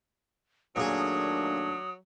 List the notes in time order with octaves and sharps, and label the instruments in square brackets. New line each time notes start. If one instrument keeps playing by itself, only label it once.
[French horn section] D#2 A3 D4 [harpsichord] A#2 G#4 [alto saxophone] F#3 [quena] D#6